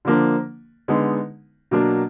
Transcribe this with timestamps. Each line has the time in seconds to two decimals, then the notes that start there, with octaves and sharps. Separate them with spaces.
0.05 D3 F3 A#3 D4
0.88 D3 G#3 B3 D#4
1.71 B2 F#3 A#3 D4